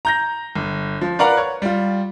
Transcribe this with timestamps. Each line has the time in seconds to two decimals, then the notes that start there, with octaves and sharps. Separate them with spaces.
0.05 A#5 G6 A#6
0.56 G1
1.01 F3
1.19 A#4 B4 D5 F5 F#5 A#5
1.37 C#5
1.62 G3 F4